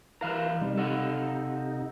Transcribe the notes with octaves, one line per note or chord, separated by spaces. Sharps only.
E3 E4 A#4 B4 F5 A#5
C3 G3 D#4
A4 F5 F#5